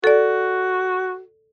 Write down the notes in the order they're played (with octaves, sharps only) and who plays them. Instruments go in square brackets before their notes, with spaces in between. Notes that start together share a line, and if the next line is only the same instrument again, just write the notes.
[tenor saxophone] F#4 [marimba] A4 D5